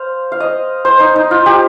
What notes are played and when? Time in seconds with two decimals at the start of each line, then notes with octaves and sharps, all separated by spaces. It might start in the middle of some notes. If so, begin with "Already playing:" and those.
Already playing: C5 F5
0.32 F5
0.40 D#5
0.85 C5
1.00 D#4
1.16 D#4
1.31 F4
1.46 G4